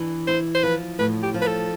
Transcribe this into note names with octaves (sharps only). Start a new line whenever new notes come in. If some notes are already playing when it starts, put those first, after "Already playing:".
Already playing: E3 D4
E4 C5
C5
F3 B4
A2 B4
G4
F3
B4
A4